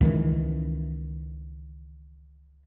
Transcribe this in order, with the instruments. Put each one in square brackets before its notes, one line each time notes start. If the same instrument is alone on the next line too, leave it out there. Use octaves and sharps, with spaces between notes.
[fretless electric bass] C#2 D#3 E3